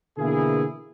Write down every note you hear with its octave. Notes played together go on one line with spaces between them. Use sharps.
B2 D3 E3 A#3 E4 G#4